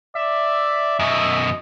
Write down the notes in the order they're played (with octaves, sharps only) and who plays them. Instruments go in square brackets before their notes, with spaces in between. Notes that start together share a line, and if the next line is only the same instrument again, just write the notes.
[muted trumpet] D5 [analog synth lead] E5
[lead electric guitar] F#2 B2 [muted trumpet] D#5